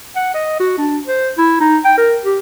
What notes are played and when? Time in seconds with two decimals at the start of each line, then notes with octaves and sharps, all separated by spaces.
0.15 F#5
0.34 D#5
0.59 F#4
0.78 D4
1.07 C5
1.38 E4
1.60 D#4
1.84 G5
1.97 A#4
2.24 G4